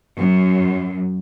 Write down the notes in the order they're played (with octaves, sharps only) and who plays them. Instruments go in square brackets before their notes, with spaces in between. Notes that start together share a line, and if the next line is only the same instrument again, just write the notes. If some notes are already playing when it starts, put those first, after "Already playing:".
[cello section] F#2